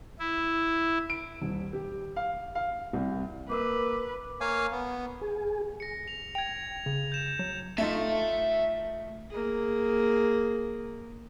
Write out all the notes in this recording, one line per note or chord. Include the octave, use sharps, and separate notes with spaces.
E4
D7
D#1
G4
F5
F5
C2
A#3 A#4 B4 D6 E6
A#3 C#5 F5 G#5
B3
G#4
A#6 C#7
F7
G5 G#6 F7
C#3
G6 E7
F#3
A3 D#4 F4 E5 A5
A#3 G#4